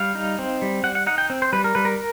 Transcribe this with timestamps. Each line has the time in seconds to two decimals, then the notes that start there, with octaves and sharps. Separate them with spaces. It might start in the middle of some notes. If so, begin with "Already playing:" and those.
Already playing: G3 F5
0.15 D#4
0.39 C4
0.62 G3
0.84 G3 F#5
0.95 F#5
1.07 D#4 F#5
1.18 G5
1.30 C4
1.42 C5
1.53 G3 B4
1.64 A#4
1.75 G3 B4
1.85 A#4